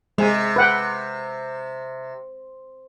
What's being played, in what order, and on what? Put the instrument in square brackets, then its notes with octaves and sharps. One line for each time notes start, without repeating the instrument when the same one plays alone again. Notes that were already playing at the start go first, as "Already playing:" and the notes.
[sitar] C3 [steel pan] G#3 G#5
[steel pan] B4 F#5 G5